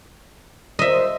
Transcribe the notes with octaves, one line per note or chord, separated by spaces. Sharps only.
A#4 C5 D#5 E5